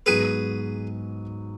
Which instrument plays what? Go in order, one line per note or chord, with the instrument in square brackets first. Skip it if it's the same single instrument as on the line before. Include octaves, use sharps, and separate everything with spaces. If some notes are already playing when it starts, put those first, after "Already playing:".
[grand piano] G#2 F#3 B3 [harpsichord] G#4 B4